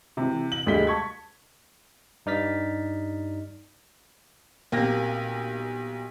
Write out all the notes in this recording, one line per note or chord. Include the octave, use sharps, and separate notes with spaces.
C3 E3
F#7
D2 G3 G#3 D#5 B6 G7
A5 C#6 G#6
G2 D#4 D5 F6 A6 B6
B1 A#2 A#3 C4 G4 A#6